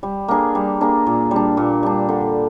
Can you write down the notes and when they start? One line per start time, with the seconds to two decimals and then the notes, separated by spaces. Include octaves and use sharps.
0.03 G3
0.28 A#3 D4 G#4
0.55 G3
0.81 A#3 D4 G#4
1.06 A#2
1.31 G3 D4
1.57 A#2
1.83 G3 D4
2.09 D3